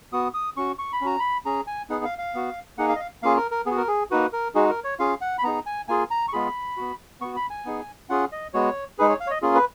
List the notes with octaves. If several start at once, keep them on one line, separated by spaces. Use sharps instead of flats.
B3 F#4 D#6
D#6
C#4 F#4 C#6
C#6
B5
C#4 F#4 A#5
B5
C#4 G#4 A#5
G#5
B3 D#4 G#4 F#5
F5
F5
B3 F#4
A#3 D#4 G#4 F#5
F5
D#5
F5
A#3 C#4 F4 G#4 F5
A#4
A#4
B3 F#4 G#4
A#4
G#4
A#3 D#4 F#4 B4
A#4
G#3 D#4 F#4 G#4
A#4
C#5
C#4 F4 G#4 F5
F#5
B5
B3 D#4 G#4 A#5
G#5
A#3 F4 G#4 G#5
A#5
C#6
G#3 B3 F4 G#4 B5
B3 F#4
B3 F#4 C#6
B5
G#5
B3 D#4 G#4
C#4 F4 G#4 F#5
D#5
G#3 B3 F#4 C#5
G#3 D#4 G#4 B4
C#5
F5
C#5
D#5
A#3 C#4 F4 G#4
B4